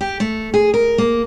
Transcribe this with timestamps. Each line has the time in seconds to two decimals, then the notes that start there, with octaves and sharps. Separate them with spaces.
0.01 G4
0.20 A3
0.54 G#4
0.74 A#4
0.98 A#3